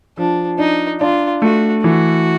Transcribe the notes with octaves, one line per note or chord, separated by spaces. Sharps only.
F3 D4
D4 D#4
D4 F4
A3 F#4
E3 F#4